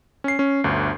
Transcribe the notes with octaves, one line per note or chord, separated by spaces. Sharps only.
C#4 C7
C#4
G1 D2